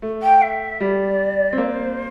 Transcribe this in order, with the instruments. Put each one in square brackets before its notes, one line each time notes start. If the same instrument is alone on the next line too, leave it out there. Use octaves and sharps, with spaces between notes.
[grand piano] A3
[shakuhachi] G5
E5
[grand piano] G3 [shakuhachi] D5
[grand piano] C4
[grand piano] A#3 [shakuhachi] C5